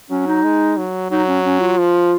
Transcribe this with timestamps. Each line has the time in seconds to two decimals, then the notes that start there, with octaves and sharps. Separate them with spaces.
0.10 F#3 C#4
0.26 D#4
0.43 G#3
0.77 F#3
1.10 F#3 D#4
1.28 C#4
1.45 C#4
1.60 F4
1.78 F3